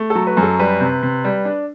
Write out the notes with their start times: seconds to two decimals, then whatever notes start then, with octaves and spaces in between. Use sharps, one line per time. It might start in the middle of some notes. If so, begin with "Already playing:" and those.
Already playing: A3
0.10 A4
0.15 F#3
0.27 B4
0.37 F#2
0.43 A4
0.59 G3 B4
0.80 C3
1.02 C3
1.24 G3
1.45 D4